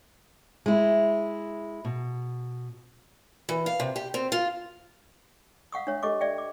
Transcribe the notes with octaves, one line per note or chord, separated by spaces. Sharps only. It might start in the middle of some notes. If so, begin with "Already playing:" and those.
G#3 E4
B2
E3
F5
C3
G4
C4
F4
F5 F#5 C#6 D#6
D4 C#5 E5
G4 A4 D#5 C#6 D6
D5 E5 G5
D6